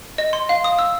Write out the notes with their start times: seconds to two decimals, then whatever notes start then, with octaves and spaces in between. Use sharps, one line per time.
0.18 D#5
0.33 C6
0.49 F5
0.64 D#6
0.79 E6